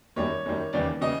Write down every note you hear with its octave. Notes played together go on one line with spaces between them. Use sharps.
F#2 D#3 G3 C#5
F#2 D#3 G3
D#2 C#3 E3 G3 D5
C#3 E3 G3 D#5